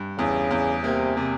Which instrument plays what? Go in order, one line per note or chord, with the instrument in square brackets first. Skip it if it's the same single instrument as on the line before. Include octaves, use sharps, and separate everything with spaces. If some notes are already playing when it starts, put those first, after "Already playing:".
Already playing: [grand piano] G2
[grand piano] E2 [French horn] C#3
[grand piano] E2
[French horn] C3 [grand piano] A#3
[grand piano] C3